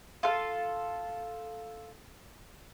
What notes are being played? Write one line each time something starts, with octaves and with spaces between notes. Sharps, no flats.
F4 A4 F5